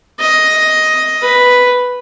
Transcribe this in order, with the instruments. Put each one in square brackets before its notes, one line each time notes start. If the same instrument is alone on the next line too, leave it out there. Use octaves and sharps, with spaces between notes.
[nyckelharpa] D#5
B4